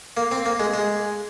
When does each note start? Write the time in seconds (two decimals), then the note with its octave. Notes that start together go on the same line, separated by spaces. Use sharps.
0.17 A#3
0.32 C4
0.46 A#3
0.59 G#3
0.74 G#3